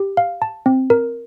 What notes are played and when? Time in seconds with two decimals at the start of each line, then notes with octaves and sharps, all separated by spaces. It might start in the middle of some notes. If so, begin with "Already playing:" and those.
Already playing: G4
0.17 F5
0.42 A5
0.66 C4
0.90 A#4